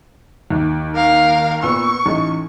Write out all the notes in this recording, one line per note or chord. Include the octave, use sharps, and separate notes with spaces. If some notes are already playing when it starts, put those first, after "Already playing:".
D#2
A#4 F5
A#2 B3 C#6 E6
A1 D#4